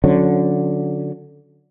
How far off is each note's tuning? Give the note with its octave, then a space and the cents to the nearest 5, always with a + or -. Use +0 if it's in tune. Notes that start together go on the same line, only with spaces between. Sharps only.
D3 -10 F#3 -30 C#4 +0